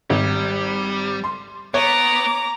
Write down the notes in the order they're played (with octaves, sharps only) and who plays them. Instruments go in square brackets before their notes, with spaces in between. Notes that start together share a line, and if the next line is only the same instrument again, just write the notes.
[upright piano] G#1 [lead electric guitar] G3
[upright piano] C6
[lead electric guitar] B3 [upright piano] C#5 [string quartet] A#5 D6